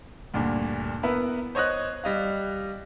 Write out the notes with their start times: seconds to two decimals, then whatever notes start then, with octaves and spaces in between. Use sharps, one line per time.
0.34 D2 G2 A#2
1.03 B3 E4 A#4 B4 E5
1.55 C5 C#5 D#5 D#6 F#6
2.04 G3 D#5 F5